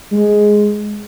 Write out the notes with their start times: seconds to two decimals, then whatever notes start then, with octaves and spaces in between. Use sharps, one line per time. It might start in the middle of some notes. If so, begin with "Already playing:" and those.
0.11 G#3